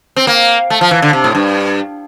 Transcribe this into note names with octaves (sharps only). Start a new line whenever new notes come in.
C4
A#3
A3
F3
E3
D3
C3
A2
G2